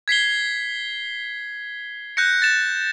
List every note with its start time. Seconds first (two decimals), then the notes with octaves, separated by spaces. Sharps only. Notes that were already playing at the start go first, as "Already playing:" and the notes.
0.08 G#6 B6 C7 G7
2.17 F#6 G6 A#6 C#7
2.42 A6 E7